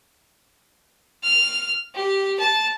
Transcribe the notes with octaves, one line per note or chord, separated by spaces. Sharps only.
F6
G4
A5